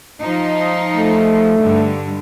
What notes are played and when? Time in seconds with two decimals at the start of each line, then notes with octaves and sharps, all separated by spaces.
0.20 F3 D#4
0.97 A3
1.60 G2 D3